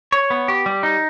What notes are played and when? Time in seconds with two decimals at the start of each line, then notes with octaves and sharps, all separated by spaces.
0.12 C#5
0.30 B3
0.48 G4
0.66 G3
0.83 D#4